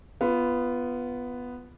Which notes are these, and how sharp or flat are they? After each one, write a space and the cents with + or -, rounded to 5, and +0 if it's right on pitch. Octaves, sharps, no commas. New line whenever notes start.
B3 +0 F4 -20